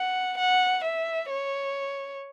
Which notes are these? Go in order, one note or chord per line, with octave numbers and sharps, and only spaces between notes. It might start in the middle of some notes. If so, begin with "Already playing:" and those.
Already playing: F#5
F#5
E5
C#5